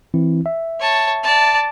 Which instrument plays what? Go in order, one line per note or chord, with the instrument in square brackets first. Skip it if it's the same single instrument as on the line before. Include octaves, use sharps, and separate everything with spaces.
[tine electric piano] E3 C4 E4
E5
[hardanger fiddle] C#5 A5
D5 A5